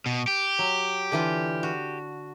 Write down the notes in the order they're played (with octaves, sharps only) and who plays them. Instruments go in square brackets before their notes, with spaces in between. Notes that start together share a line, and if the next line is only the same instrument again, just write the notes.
[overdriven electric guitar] B2
G4
[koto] F#3
D3 E3 F4
F#4